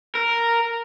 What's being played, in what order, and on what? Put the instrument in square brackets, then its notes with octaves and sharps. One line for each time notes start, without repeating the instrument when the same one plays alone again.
[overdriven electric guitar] A#4